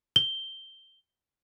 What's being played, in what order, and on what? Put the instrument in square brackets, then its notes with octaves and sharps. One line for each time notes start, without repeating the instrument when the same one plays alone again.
[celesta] G7